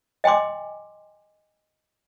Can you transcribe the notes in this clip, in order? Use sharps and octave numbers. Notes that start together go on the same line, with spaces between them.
D#5 G5 G#5 C6 D6